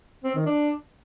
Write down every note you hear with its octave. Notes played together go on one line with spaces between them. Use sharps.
C4
D#3
D4